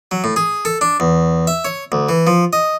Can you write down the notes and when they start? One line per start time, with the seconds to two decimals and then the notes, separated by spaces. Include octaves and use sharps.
0.11 F#3
0.24 A2
0.36 G#4
0.65 A4
0.81 D4
1.00 E2
1.47 E5
1.65 C#5
1.92 D2
2.09 E3
2.27 F3
2.53 D#5